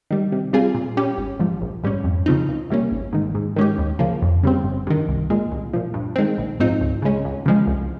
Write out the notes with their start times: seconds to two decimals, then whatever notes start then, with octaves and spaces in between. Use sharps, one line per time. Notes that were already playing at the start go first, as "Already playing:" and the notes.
0.11 D#3 G3
0.32 C3
0.53 G3 C4 F4 G#4
0.75 A#2
0.97 G3 C#4 G4
1.18 G#1
1.39 G#2 F3
1.62 A#1
1.84 G#2 G3 C#4
2.04 F2
2.26 C#3 F3 C4 D#4
2.49 C#2
2.70 C3 G3 A#3 C#4
2.91 G#1
3.13 G#2 D#3
3.35 G#2
3.56 D#3 G#3 C#4 G4
3.78 D#2
3.99 C#3 F3 A#3
4.22 F2
4.43 C#3 G3 C4
4.64 G1
4.87 G2 D#3
5.08 C2
5.30 A#2 G#3
5.52 C2
5.73 A#2 F3
5.94 G2
6.16 D#3 G#3 C4
6.38 A#1
6.60 G#2 F3 C4 D#4
6.81 C#2
7.02 C#3 G#3 C#4
7.25 C#2
7.46 C#3 F3 G#3
7.67 C2